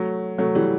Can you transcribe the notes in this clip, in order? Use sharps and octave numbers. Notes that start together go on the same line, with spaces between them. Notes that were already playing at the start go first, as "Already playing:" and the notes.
Already playing: F#3 A3
F#3 A3
E3 G3